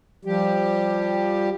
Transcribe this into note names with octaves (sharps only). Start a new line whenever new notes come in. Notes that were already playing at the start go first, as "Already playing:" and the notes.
F3 G3 G4